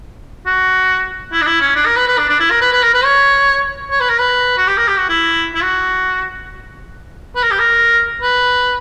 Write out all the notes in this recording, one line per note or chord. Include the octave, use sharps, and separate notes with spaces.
F#4
E4
D4
E4
C#4
D4
A#4
B4
B4
D4
D4
E4
A#4
B4
B4
A#4
B4
C#5
C#5
B4
A#4
B4
F#4
G4
A#4
G4
F#4
E4
E4
F#4
B4
A#4
G4
A#4
B4